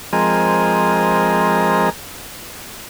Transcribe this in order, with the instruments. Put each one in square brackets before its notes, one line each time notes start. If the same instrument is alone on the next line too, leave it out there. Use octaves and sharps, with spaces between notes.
[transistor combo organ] F3 G#3 C4 G#4 A#4 D#5